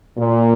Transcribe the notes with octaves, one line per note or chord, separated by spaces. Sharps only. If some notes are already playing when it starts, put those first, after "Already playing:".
A#2